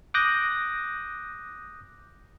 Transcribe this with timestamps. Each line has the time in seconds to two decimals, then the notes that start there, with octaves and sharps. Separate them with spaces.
0.14 D6 D#6 F#6 G6 A#6